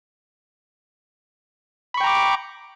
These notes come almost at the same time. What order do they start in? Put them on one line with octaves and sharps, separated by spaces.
B5 C#6 G5 A#5 D6